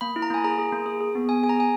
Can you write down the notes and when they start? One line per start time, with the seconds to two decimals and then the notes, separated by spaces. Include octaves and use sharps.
0.01 A#3 B5
0.16 E4
0.22 A#5
0.30 A#3 G#5
0.44 G#4 A#5
0.58 G#4
0.72 A#3
0.86 G#4
1.01 G#4
1.15 B3
1.28 B3 G#5
1.43 G#4 G#5
1.49 A#5
1.57 G#4 G#5